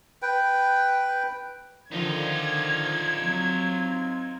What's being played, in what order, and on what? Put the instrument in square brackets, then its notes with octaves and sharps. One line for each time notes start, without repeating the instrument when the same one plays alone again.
[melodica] B4 G5
[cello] D3 F3 [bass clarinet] D#3 [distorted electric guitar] D#4 F4 [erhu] G#6
[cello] F#3 [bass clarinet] C4